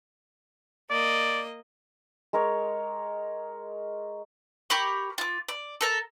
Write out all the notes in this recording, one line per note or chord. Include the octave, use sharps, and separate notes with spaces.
A#3 D5 D#5
G#3 A#4 C#5
G4 A#4 B5 C#6
F4 D6
D5
A4 A#4 A5